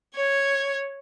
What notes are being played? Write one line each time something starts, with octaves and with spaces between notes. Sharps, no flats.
C#5 G#6